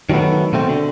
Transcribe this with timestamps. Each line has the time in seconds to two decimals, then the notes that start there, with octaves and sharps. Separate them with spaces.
0.10 D#3 F#3 G3 A3 B3
0.53 B2 A3 C4
0.69 D3